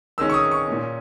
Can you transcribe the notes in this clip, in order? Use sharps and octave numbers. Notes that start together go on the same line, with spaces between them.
D#3 G#3 C#4 E6
C#6
D#6
C#6
A#2 A#3 C#4